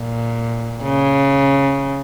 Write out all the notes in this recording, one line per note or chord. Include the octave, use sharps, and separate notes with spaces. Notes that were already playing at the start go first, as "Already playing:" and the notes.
Already playing: A#2
C#3